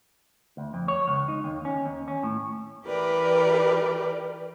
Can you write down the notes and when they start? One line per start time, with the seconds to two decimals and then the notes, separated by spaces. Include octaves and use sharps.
0.57 D2
0.74 F2
0.88 C#5
1.08 C#2
1.28 D#4
1.44 D#2
1.65 C#4
1.85 D#2
2.08 C#4
2.23 A2
2.86 E3 G4 A#4 B4 D5